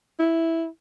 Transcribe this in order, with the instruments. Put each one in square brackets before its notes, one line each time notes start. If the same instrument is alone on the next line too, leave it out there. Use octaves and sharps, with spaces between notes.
[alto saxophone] E4